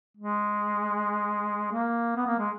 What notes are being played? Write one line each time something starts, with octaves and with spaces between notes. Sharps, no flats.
G#3
A#3
B3
A#3
G#3